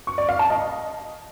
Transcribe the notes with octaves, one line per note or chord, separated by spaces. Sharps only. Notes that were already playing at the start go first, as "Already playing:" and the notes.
C#6
D5
F5
A5
D#5